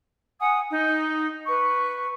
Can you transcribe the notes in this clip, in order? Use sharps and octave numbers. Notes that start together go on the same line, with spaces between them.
F#5 G#5 D#6
D#4
B4 C#6